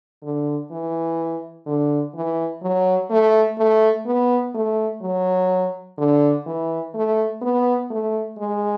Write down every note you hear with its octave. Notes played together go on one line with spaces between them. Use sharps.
D3
E3
D3
E3
F#3
A3
A3
B3
A3
F#3
D3
E3
A3
B3
A3
G#3